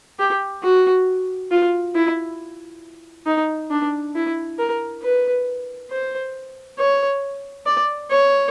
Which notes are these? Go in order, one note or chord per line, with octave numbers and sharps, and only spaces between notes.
G4
F#4
F4
E4
D#4
D4
E4
A#4
B4
C5
C#5
D5
C#5